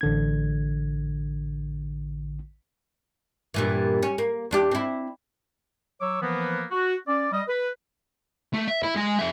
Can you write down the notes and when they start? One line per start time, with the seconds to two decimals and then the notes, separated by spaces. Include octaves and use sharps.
0.01 A1 D3 G#6
3.54 G2 A#2 E3
4.03 C#4
4.18 A#3
4.51 E2 D4 G4
4.72 C4 E4
6.01 F#3 C#5 C#6 D6 E6
6.22 E3 F3 A#3 B3
6.71 F#4
7.07 C#4 D5
7.32 G3 D#5
7.48 B4
8.54 A3
8.68 E5
8.83 E4
8.96 G#3 G#5
9.19 F2 E5